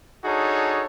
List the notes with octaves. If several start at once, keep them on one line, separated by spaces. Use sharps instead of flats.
D4 D#4 F#4 G#4 A4 C#5